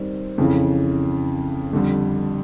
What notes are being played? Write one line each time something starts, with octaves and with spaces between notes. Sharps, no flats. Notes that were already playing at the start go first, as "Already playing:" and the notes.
Already playing: D#3 G3 C4
F2 C#3 E3
F2 D3 G3